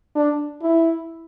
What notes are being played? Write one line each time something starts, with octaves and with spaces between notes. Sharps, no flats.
D4
E4